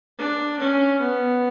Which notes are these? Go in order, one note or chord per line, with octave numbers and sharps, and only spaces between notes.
D4
C#4
B3